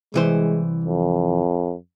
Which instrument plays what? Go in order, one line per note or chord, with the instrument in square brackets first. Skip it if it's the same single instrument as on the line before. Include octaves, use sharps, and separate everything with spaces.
[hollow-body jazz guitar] C2 E3 C5 [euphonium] G#3
[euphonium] F2